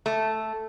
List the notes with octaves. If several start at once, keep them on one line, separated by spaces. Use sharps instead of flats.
A3